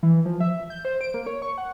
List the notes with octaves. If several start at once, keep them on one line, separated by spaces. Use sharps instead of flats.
E3
F3
E5
G6
C5
D7
A#3
C#5
C#6
F#5